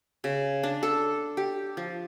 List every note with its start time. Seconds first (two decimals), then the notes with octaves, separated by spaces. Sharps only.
0.24 C#3
0.63 D4
0.83 A4
1.37 G4
1.77 F3